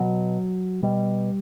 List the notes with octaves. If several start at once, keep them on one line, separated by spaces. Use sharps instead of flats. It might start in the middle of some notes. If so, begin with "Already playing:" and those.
Already playing: B2 F#3
B2 G3